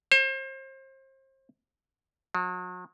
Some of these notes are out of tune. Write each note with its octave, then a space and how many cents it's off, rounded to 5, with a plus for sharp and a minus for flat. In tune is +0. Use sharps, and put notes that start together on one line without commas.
C5 +35
F#3 -40